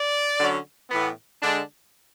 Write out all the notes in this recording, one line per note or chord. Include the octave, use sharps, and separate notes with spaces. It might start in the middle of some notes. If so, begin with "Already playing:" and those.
Already playing: D5
D3 F#3 C#4
A2 E3 B3
D3 G#3 D4